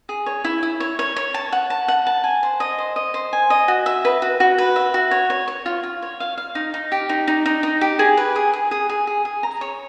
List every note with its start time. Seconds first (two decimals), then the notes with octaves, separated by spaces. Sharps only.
0.09 G#4
0.26 C#5
0.44 E4
0.63 E4
0.80 C#5
0.99 C#5
1.16 C#5
1.34 A5
1.52 F#5
1.70 A5
1.88 F#5
2.07 A5
2.24 G#5
2.43 C5
2.60 D#5
2.78 C5
2.96 D#5
3.14 C5
3.33 G#5
3.50 D#5
3.68 F#4
3.86 E5
4.05 B4
4.22 F#4
4.40 F#4
4.58 B4
4.76 E5
4.94 F#4
5.11 C#5
5.30 C#5
5.48 C#5
5.66 F4
5.83 F4
6.02 C#5
6.20 F5
6.38 F5
6.55 D#4
6.74 D#4
6.92 G4
7.09 D#4
7.28 D#4
7.46 D#4
7.63 D#4
7.81 G4
7.99 G#4
8.17 B4
8.36 G#4
8.53 G#4
8.71 G#4
8.89 G#4
9.07 G#4
9.25 G#4
9.43 A#5
9.61 C#5